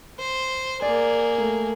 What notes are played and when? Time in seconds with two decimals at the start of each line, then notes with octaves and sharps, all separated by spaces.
0.19 C5
0.82 A#3 G#4 D5
1.38 A3